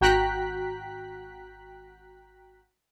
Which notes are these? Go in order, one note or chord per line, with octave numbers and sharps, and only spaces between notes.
G#1 F#4 G5 A#5 F#6 B6